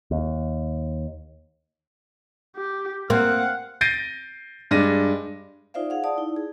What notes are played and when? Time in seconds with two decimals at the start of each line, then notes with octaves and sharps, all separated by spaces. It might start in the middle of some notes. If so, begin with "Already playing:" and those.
0.11 D#2
2.57 G4
3.10 A#3 C4 F5 F#5
3.81 G6 A6 A#6 C7 D7 D#7
4.71 G2 G#3 D5 A#6 D#7
5.74 D#4 F4 C5 D5 E5 F5
5.90 G#4 F5 F#5
6.04 D5 A5 D#6
6.16 D#4 E4
6.36 G#4